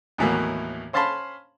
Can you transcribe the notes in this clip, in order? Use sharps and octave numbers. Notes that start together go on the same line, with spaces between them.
D#2 A2 E3 F#3 A#3 B3
C#4 C5 F5 A5 B5 C6